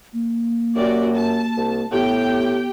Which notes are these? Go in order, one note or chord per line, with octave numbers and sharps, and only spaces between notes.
A#3
F#2 F#4 G4 D5
A5
C2
A2 B3 G4 G5